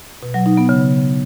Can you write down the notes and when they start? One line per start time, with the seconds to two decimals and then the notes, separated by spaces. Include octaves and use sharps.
0.23 B2
0.34 F#3
0.46 D#4
0.57 B3
0.69 C#3